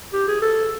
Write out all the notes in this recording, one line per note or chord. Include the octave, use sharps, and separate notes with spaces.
G4
G#4
A4